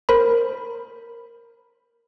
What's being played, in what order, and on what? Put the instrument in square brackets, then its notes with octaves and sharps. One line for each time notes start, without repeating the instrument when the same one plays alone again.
[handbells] A#4 C5 B5